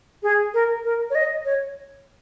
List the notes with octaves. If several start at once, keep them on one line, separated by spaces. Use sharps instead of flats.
G#4
A#4
A#4
C#5
D#5
C#5